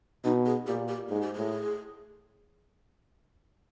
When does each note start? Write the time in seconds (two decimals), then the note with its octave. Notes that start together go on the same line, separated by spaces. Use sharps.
0.24 B2 D#4
0.46 G#4
0.67 A#2 G4
0.88 G4
1.09 G#2 G#4
1.21 G4
1.34 A2 G#4